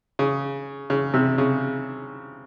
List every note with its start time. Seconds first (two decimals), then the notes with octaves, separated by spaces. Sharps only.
0.19 C#3
0.90 C#3
1.14 C3
1.38 C#3